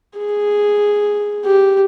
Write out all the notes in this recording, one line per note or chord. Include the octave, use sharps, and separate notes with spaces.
G#4
G4